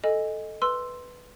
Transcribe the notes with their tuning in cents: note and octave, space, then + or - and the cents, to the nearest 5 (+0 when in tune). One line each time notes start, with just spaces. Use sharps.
A4 +0 D#5 +0 G#5 -15
B4 +0 C6 +0 E6 +5